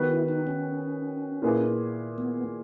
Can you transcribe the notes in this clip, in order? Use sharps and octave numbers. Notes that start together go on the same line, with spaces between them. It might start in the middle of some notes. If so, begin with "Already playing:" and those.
Already playing: D#3 G#3 B3 F#4 B4
E4
D#4
C#4
A#2 A#3 E4 G#4 B4
B3